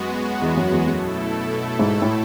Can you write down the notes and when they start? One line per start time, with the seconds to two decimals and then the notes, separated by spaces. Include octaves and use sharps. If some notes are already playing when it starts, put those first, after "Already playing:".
Already playing: F#2 G#3 B3 F#4
0.42 E2
0.57 F#2
0.72 E2
0.87 F#2 B2 A3 E4 A4
1.79 G#2
2.02 A2